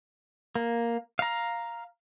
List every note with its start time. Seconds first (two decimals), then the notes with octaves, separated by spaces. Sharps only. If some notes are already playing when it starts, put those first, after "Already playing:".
0.55 A#3
1.19 F5 A#5